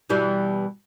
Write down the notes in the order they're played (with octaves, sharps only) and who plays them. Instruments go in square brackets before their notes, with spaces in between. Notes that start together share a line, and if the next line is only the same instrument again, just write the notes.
[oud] B2 E3 G3